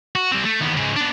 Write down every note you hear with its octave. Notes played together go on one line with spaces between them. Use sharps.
F#4
G3 C4
A3
D#2 B3
G#2 C#3
B3 D4